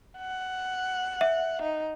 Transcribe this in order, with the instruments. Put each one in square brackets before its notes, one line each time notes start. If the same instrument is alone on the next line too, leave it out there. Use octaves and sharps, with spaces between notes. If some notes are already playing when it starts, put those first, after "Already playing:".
[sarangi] F#5
[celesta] E5
[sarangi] D#4